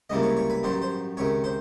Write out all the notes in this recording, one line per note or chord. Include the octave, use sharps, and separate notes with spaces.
C#2 C3 E3 G3 A#3 D#5
C#5
C#5
B4
A1 G2 D#3 F#3 C5
C5
C#2 C3 D#3 C#5
C5